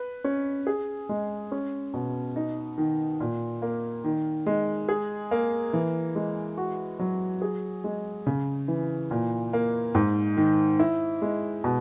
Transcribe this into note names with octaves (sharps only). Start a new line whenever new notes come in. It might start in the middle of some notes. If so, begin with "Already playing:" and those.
Already playing: B4
C#4
G#4
G#3
C#4
B2
D#4
D#3
A#2
A#3
D#3
G#3
G#4
A#3
E3
G#3
F#4
F#3
G#4
G#3
C#3
E3
A#2
A#3
G#2
D#3
E4
G#3
B2